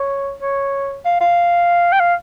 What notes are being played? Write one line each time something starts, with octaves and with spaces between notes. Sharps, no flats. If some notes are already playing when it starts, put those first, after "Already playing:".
Already playing: C#5
C#5
F5
F5
G5
F5